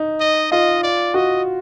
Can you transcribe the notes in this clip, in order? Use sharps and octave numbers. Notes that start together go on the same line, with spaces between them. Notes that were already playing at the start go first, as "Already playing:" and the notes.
Already playing: D#4
D#5
F4 D#5
D5
F#4 D#5